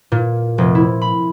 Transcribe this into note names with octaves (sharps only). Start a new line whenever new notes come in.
A#2
F1
E4
B5